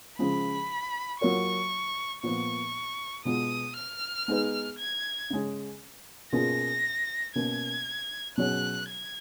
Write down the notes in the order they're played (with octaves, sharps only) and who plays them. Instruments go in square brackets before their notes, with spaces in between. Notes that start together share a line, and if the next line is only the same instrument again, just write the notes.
[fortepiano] C#3 F3 G#3 [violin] B5
[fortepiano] F#3 A#3 F4 A#4 C#5 [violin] C#6
[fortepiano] A#2 F3 B3 F4 [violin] C#6
[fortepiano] B2 G#3 B3 F4 [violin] D#6
[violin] F6
[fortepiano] G#3 B3 D#4 G#4 B4
[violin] G#6
[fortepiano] C#3 G#3 C#4
[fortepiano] B2 A#3 C#4 F4 G#4 [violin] A#6
[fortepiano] B2 A#3 C#4 [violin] G#6
[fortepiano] B2 F#3 C#4 G#4 C#5 [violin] F#6
[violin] G#6